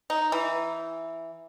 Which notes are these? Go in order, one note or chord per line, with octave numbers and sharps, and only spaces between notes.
D#4
E3